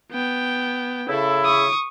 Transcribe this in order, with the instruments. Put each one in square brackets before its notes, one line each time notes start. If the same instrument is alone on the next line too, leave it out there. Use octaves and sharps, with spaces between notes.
[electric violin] B3 G5
[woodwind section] C#3 E4 [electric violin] A4
[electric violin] C#6 D#6